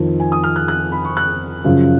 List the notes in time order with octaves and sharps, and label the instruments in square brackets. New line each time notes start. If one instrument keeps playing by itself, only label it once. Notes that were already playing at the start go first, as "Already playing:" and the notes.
Already playing: [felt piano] F2 D#3
G#5
D#6
F6
F#6
F#6
B5
C#6
F#6
F#2 C#3 F3